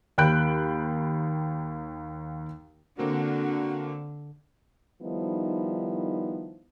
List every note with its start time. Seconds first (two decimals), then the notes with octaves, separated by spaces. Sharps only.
0.18 D#2 G5 B5 F#6 G6 D7
2.99 D3 A#3 C4 F#4 A#4
5.02 D#3 F3 G3 B3 D#4 E4